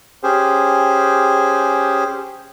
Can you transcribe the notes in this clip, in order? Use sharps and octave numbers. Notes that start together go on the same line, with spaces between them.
C#4 G4 G#4 C5